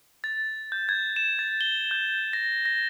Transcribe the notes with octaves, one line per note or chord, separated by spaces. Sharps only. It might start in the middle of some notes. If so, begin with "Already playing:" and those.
A6
G6
G#6
E7
A6
G7
G6
A#6
A#6